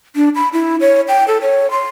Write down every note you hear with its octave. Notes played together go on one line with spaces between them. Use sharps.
D4
B5
E4
C#5
G5
A4
C#5
C6